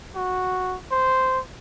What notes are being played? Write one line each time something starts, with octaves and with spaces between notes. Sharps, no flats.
F#4
C5